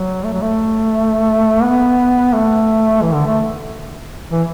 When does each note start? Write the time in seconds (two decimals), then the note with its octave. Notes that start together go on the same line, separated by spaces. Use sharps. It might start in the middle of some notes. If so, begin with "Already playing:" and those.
Already playing: F#3
0.24 A3
0.33 F#3
0.41 A3
1.63 B3
2.33 A3
3.02 E3
3.14 D3
3.26 A3
4.32 E3